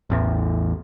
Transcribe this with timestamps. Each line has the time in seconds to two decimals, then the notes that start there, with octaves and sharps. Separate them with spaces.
0.10 A1 E2